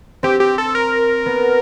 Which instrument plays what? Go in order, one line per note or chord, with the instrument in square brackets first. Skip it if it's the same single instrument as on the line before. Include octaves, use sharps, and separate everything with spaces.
[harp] C4 [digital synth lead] G4
[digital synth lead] G4
A4
A#4
[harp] B3